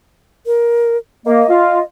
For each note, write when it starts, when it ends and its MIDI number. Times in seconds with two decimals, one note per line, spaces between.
0.46 0.97 70
1.26 1.43 58
1.26 1.83 75
1.49 1.78 65